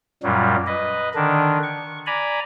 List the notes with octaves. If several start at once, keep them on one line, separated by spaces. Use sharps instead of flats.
F#2 A#2 F#3 G3
B4 D#5
D3 D#3 D4
C#6
D5 G#5 A#5 B5